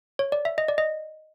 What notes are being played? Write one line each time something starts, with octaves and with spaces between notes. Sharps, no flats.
C#5
D5
E5
D#5
D5
D#5